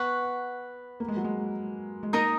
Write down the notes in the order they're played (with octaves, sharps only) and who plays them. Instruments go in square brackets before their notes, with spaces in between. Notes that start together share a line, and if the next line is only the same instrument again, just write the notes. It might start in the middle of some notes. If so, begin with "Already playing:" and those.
Already playing: [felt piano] B3 [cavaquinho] B4 F#5 C#6
[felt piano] A#3
G#3
F#3
G#3
G#3
[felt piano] A#3 [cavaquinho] D#4 A#4 D#5 A#5